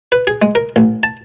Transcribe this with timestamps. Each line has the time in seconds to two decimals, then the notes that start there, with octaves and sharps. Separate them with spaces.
0.12 B4
0.27 G#4
0.42 G#3
0.55 A#4
0.76 A1
1.03 A5